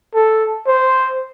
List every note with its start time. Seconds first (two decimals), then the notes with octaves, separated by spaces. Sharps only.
0.14 A4
0.67 C5